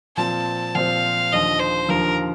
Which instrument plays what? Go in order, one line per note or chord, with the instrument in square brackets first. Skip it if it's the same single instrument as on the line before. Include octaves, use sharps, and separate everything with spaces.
[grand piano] A#2 F3 C4 F4 C5 [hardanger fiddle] A5
[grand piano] A#2 F3 C4 F4 C5 [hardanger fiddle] F5
[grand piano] D#2 D3 F3 [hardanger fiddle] D#5
[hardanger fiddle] C5
[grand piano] D#2 D3 F3 [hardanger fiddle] A#4